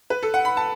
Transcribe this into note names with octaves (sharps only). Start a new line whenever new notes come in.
B4
A4
F#5
B5
A5